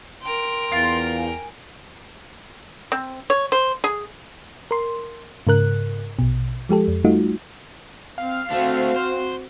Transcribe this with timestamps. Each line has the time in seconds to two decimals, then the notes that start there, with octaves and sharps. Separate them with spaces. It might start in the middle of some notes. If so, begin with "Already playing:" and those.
0.22 A#4 G5 C6
0.72 E2 F4
1.18 G#5
2.92 C4
3.30 C#5
3.52 C5
3.84 G#4
4.71 A#4 C6
5.47 G#2 C#3 A#4 F#6
6.19 A#1 B2
6.69 F3 G#3 G4 A4
6.88 F2
7.04 G3 A3 D#4 F4 F#4
8.18 C4 F5
8.51 A3 C4 D4 F#4
8.96 C5